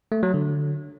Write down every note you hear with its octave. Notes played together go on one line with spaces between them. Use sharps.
A3
F#3
D3